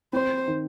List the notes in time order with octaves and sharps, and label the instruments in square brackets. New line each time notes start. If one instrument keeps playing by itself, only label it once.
[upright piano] C4 [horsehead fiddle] C5
[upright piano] D#3